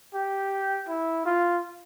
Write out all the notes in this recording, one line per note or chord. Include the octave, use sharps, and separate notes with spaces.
G4
E4
F4